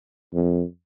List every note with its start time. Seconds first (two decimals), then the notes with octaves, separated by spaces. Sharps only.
0.34 F2